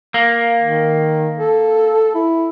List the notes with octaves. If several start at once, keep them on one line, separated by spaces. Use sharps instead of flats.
A#3
D#3
A4
E4